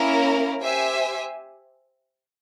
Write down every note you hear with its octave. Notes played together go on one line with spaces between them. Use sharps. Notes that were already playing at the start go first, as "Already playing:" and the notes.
Already playing: A#3 C#4 E4 A#4
G4 C5 E5 G#5